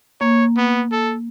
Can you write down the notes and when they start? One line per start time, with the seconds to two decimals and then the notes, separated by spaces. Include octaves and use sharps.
0.21 A#3 C#5
0.57 B3
0.92 A4